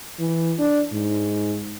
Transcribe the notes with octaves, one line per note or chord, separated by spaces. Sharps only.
E3
D4
G#2